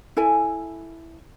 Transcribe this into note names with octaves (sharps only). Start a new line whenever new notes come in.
E4 A4 G#5